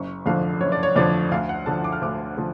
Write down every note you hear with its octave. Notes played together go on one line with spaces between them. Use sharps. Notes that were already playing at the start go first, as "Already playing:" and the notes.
Already playing: F#1 C#6
F2 D3 F3 F5
F#1 C#5
D5
C#5
F2 D3 F3 D5
D2 F5
F#5
D3 F3 A5
D6
F6
D2 D6
D3 F3